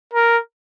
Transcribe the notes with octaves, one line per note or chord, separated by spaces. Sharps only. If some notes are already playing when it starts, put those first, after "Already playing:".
A#4